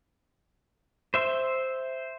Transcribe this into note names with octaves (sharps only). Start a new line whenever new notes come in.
C5 E5